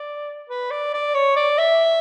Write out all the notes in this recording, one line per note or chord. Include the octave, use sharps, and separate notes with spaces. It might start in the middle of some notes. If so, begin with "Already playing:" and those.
Already playing: D5
B4
D5
D5
C#5
D5
E5